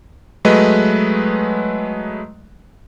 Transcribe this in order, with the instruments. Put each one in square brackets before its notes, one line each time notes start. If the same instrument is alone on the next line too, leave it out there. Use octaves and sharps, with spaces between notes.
[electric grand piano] F#3 G#3 A3 B4 D#5